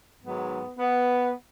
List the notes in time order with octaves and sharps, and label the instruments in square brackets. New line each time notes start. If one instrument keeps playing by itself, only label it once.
[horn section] G#2 D#3 F#3 B3
B3